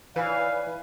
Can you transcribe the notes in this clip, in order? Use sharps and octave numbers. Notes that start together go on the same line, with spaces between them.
E3 D#4 B4 C#5 D5 F5 G#5